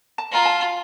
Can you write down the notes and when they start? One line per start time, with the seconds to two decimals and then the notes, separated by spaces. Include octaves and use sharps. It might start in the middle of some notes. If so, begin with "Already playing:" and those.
0.18 A5
0.32 F4 A#5
0.45 A5